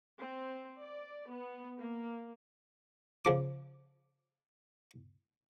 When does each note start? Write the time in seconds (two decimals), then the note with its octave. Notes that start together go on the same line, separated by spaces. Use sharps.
0.20 C4
0.80 D5
1.31 B3
1.78 A#3
3.25 C#3 F3 D6